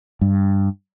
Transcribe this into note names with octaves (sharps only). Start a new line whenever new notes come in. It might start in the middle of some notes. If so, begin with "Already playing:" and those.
G2